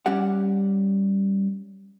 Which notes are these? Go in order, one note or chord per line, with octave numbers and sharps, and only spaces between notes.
G3 C#4 G4 F#5